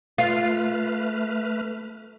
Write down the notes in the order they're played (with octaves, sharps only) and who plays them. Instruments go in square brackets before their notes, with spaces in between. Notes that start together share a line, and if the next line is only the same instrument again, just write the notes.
[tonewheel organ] A3 B4 F6 [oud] F4